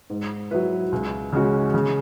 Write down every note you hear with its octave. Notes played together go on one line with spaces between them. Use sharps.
G#2
F#3 E4 B4
C#2
C#3 G#3 C#4 F#4
C#3